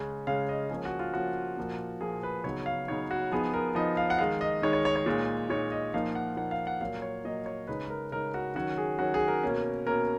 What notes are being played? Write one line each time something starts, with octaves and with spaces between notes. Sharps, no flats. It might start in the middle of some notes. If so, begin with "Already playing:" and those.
Already playing: C#3 G#3 C#4
C#3 G#3 C#4 F5
D#5
F3 A#3 C#4 G#4
F#4
F4
F3 A#3 C#4 F#4
A#2 F3 A#3
A#2 F3 A#3 G#4
B4
C#3 F#3 B3 D#4 C#5
F5
C#3 F#3 B3 D#4 C#5
F#4
F3 B3 D#4 G#4
A#4
F3 B3 D#4 D#5
F5
F#5
D#3 G#3 D#4 F5
D#5
D#3 G#3 D#4 C#5
C#5
C#5
C#5
A#2 G#3 D#4
A#2 G#3 D#4 C#5
D#5
A#2 F3 A#3 D#4 F5
F#5
A#2 F3 A#3 D#4 F#5
F5
F#5
A#2 F#3 A#3 F5
C#5
A#2 F#3 A#3 D#5
C#5
C#3 G#3 D#4 B4
A#4
C#3 G#3 D#4 A#4
F#4
D#3 F#3 C#4 F#4
G#4
D#3 F#3 C#4 F#4
G#4
A#4
B2 A#3 C#4
B2 A#3 C#4 A#4